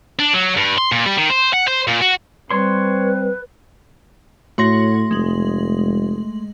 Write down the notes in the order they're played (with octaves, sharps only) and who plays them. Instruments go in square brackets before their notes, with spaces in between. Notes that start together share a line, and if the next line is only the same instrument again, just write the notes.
[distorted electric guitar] D4
F#3
G2
C6
A#2
G3
D#3
C5
F#5
C5
A#2
F#4
[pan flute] G3 [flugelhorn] C4 [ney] B4 [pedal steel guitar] C#5 C6
[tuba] A2 [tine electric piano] A3 C6 A#6 [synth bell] F#4 C#5
[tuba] F1 [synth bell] G#3 F#7